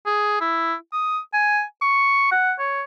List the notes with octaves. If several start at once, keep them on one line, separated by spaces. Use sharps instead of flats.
G#4
E4
D#6
G#5
C#6
F#5
C#5